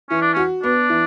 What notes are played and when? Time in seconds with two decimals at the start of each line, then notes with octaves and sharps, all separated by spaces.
0.10 E3 C#4
0.21 D4
0.33 C#4 F#4
0.63 B3 D4
0.89 E3